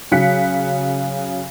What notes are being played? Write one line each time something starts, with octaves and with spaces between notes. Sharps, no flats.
C#3 F#3 F#6 B6 C#7